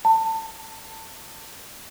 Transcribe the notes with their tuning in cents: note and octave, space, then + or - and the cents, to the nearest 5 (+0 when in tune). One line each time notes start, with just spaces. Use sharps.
A5 +30